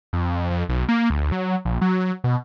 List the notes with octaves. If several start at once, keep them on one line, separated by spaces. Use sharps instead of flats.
F2
F2
B1
A#3
D2
F#3
A#1
F#3
B2